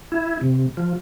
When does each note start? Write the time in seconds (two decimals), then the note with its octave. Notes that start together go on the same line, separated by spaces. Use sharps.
0.12 E4
0.41 C3
0.77 F3